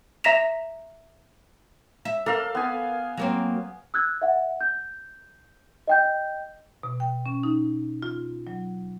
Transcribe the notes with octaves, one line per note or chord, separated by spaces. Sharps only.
E5 A#5 A#6 B6 E7 F7
E5
A4 A#4 F5
B3 G#5
F#3 A#3 C4
E6 F#6 G#6
E5 F#5
G6
D#5 G5 G6
B2
G5
C#4
D#4
F4
F#3